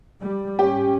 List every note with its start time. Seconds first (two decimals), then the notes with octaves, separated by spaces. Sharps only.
0.20 G3
0.59 G#2 C#4 G4